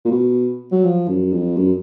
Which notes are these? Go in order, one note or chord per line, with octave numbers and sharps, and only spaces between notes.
A#2
B2
F#3
F3
F#2
F2
F#2